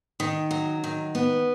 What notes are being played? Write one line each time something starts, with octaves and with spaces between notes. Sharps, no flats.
D#3
F#3
D#3
B3